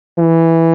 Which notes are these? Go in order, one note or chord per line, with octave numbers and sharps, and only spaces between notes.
E3